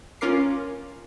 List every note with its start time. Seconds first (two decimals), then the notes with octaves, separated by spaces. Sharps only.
0.21 C#4 F4 A#4 D6 C7